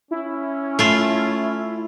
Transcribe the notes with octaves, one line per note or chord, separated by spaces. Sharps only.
C#4 E4
A3 F4